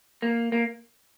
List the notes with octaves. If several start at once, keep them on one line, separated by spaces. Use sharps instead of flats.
A#3
A#3